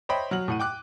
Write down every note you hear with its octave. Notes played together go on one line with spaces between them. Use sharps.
C5 C#5 D#5 E5 G5 B5
F#3 F6 F#7
A2 F#5 D#7
G5 D6 F#6